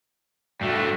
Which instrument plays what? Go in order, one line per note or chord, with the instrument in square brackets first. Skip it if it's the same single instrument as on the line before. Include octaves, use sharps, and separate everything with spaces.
[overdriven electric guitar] G2 A3 [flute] F#4